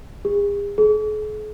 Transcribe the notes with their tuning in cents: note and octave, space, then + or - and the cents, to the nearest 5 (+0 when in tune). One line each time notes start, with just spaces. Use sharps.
G#4 -45
G#4 +45